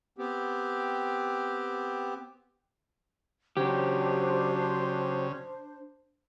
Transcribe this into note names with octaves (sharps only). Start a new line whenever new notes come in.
B3 C4 G4
C#3 F#3 D4 G4 C5